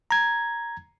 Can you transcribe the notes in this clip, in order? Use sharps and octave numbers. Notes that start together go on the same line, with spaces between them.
A#5 G#6